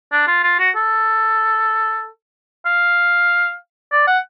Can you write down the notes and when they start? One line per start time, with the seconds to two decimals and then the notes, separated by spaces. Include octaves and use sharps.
0.12 D4
0.27 F4
0.43 F4
0.59 F#4
0.76 A4
2.66 F5
3.92 D5
4.07 F#5